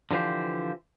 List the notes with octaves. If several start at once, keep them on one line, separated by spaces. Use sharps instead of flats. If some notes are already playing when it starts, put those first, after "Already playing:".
D3 E3 F3 G4 C5